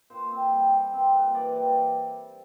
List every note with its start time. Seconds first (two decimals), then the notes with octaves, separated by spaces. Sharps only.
0.10 A#2 C5
0.31 C4
0.52 G3
0.71 G3
0.93 C4
1.14 A#2
1.34 E3 D5
1.55 G3